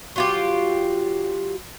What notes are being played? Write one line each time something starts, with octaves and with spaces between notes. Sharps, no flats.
F#3 F4 G4